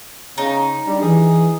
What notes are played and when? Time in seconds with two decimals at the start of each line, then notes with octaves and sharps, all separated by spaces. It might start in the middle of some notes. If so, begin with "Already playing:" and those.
0.38 C#3 D#4
0.87 G3 D4
1.02 E3 G#4